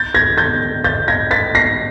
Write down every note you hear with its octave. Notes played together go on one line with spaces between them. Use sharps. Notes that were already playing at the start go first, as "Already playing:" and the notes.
Already playing: G6 A6
G#6 A#6
G6 A6
G6 A6
G#6 A#6
A6 B6
A#6 C7